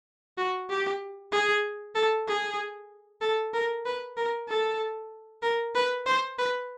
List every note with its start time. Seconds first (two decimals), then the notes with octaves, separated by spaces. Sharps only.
0.38 F#4
0.69 G4
1.32 G#4
1.95 A4
2.28 G#4
3.21 A4
3.54 A#4
3.85 B4
4.17 A#4
4.48 A4
5.43 A#4
5.75 B4
6.06 C5
6.39 B4